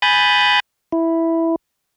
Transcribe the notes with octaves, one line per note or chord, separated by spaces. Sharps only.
G#5 B5 D#6 F#6 G6 A6
E4